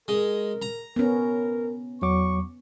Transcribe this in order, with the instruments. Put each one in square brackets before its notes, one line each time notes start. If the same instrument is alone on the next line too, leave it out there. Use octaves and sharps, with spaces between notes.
[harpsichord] G#3 [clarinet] A#4
[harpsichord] A#5
[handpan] B3 C#4 [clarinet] A#4
[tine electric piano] E2 F#3 D6 [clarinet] C#6